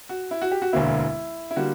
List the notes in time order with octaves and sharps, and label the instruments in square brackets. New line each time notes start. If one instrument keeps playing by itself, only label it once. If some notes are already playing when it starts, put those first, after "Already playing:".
[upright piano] F#4
E4
F#4
G4
F#4
E1 D2 D3 A#3 E4
E4
D3 G3 A#3 F#4